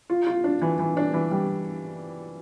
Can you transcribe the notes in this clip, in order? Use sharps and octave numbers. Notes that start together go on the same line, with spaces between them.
F4
F4
D4
E3
E3
D4
E3
G3